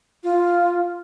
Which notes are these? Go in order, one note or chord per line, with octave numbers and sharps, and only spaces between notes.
F4